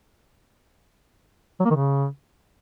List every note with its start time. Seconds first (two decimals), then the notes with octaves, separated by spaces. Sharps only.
1.60 F#3
1.65 A#3
1.70 D#3
1.75 C#3